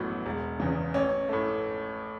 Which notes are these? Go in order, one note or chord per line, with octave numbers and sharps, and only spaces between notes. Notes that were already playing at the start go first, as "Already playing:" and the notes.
Already playing: A1 A2 F#3 B3
E1
E2 C#3
A1 C#4
A2 A3